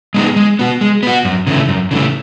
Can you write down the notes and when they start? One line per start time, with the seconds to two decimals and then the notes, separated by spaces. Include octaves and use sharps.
0.14 G#3 B3 D#4 G#4
0.36 G#3
0.59 B3 F#4
0.81 G#3
1.03 B3 F#4
1.25 F#2
1.47 C#3 E3 A3
1.69 F#2
1.91 C#3 E3 A3